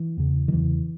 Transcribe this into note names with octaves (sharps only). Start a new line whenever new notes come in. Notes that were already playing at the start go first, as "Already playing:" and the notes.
Already playing: E3
E2 C#3
D#3
E2 C#3 E3